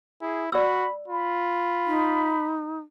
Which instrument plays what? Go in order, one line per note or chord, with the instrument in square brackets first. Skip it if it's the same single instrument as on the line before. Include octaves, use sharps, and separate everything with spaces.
[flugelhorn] E4 [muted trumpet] G#4
[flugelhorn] F#4 [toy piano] D5 E6 [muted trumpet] B5
[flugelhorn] F4 [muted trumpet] B5
[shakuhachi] D#4